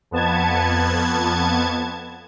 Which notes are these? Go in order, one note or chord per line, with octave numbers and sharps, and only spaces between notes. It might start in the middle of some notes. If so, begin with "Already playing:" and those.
F2 B3 A5 G#6